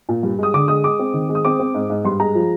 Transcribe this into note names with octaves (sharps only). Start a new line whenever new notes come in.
A#2
G2
G#3 D#6
D3 D6
G#3 D#6
G#3 D6
C4
D#3
G#3
D#6
C4 D6
C4
G#2
G#2
G2 C6
G#3 A#5
F3